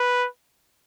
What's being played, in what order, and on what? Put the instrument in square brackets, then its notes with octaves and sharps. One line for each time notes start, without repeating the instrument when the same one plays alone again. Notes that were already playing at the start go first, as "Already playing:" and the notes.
Already playing: [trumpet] B4